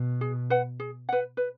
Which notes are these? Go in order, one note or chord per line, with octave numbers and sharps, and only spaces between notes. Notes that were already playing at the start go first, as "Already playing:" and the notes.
Already playing: B2
G#4
B4 F#5
G#4
B4 F#5
B4